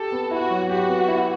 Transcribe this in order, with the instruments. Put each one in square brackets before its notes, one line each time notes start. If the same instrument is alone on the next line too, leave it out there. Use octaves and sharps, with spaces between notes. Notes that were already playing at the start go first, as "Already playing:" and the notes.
Already playing: [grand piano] G4 [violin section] A4
[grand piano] B3
[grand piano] E4 [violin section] F#4
[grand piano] F#3
[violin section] F#4 [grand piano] G4
[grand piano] B3
E4